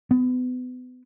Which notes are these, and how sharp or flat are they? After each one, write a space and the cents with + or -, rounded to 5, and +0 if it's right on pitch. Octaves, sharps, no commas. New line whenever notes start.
B3 +30